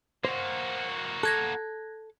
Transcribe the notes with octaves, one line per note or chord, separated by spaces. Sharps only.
A#3 F#4 C5
A4 F#6 G#6 A#6